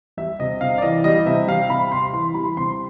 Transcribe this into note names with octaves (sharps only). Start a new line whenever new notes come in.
G3 E5
C3 D#5
C3 F5
D5
E3 D#5
G3 D#5
C3 E5
G3 F5
C3 B5
C3 C6
E3 C6
G3 B5
C3 C6